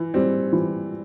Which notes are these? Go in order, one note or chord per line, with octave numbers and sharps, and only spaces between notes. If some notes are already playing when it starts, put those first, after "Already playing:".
Already playing: E3
G3 C4
E3